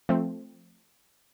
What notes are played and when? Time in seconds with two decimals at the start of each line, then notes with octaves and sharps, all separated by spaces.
0.09 F3 A3 C4